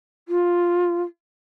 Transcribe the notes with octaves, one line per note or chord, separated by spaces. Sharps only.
F4